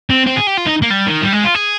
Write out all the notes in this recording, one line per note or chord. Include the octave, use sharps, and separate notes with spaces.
C4
C4
G#4
G4
F4
D#4
A#3
G3
D#3
G3
G#3
F4
G#4